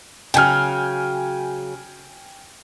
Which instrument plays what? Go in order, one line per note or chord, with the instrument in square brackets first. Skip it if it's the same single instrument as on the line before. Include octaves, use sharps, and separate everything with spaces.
[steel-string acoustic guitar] C#3 F#3 [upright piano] G5 G#5 F6